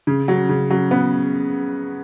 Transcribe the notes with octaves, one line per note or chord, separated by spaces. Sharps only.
C#3
F#3
C#3
F#3
B3